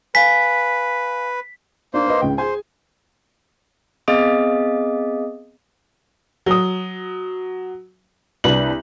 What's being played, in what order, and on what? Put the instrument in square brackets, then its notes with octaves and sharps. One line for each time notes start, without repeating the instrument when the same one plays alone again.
[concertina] B4 [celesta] F5 G#5 [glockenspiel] B6
[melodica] A#3 C5 [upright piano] D4
[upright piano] B4 D#5 C6
C#2 C#3 G5
[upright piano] G#4 G#5 [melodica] C5
[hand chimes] B3 C4 G#4 D#5 F5 D#6
[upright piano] F#3 D#6
[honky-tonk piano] C2 B4 F#7 [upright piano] D4